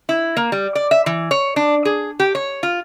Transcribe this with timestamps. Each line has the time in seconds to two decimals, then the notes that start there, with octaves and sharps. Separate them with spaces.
0.09 E4
0.37 A#3
0.52 G3
0.75 D5
0.91 E5
1.06 E3
1.31 C#5
1.56 D4
1.85 G#4
2.20 G4
2.35 C#5
2.63 F4